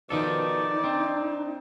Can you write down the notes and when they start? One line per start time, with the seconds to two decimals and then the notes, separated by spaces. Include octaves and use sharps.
0.10 B2 D#3 F3 D#4 A4 D5
0.84 C4 D4